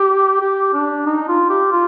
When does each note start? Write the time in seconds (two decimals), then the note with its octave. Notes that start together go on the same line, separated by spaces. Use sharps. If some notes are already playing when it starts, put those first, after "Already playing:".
Already playing: G4
0.41 G4
0.73 D4
1.06 D#4
1.28 F4
1.49 G4
1.72 F4